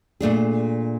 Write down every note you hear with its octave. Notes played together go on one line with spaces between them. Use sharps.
A#2 A3 D4 G#4